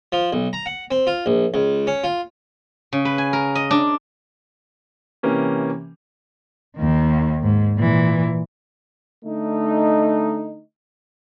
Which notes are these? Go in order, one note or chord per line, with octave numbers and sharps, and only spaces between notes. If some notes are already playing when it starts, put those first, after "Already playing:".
F3
B1
A#5
F#5
C4
F4
A#1
C#2
C#4
F4
C#3
B4
G#5
A#4
D#5
D4
C3 E3 A#3 C#4 G4
D#2 D#3
G#2
A#2 E3
D3 A3 D#4